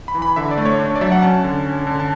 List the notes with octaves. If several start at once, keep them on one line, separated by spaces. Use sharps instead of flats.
B5
E3
B5
D3 E5
D5
A3
C#5
D4
C#5
D5
F#3 E5
F#5
C#4 A5
D3
C#4
D3
A5